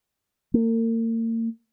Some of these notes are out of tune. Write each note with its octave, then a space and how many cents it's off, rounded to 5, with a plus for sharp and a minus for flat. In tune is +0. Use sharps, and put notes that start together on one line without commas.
A#3 -40